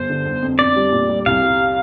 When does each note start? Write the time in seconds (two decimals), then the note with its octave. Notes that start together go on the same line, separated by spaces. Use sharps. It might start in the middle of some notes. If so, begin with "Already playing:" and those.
Already playing: G1 C5
0.10 D3
0.26 G1
0.42 F2
0.59 D4 D5
0.76 G3
0.92 A#2
1.09 G3
1.26 C2 F5
1.43 G4